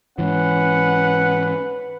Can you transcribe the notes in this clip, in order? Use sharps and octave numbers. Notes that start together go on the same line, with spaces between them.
G#2 E3 C#4 B4 F#5